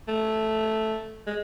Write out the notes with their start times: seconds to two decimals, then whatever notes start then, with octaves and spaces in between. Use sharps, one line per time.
0.08 A3
1.27 G#3